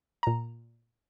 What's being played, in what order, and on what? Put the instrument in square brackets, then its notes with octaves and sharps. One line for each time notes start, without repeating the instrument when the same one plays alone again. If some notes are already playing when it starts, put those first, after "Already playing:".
[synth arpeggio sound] A#2 A#5